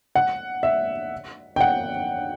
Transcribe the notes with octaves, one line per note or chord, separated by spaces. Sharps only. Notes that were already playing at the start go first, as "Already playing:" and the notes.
F#5
E5
G5
F#5